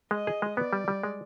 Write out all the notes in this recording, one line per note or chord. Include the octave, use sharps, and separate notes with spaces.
G#3 D#5
G#4
G#3
B3 D5
G3
G3
G#3